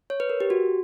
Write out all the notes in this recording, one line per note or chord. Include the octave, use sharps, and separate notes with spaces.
C#5
B4
A#4
G4
F#4